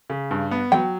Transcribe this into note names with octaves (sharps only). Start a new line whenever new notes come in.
C#3
G2
B3
F#3 G5